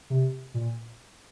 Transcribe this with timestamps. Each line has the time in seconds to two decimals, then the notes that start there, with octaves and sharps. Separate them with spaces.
0.10 C3
0.54 A#2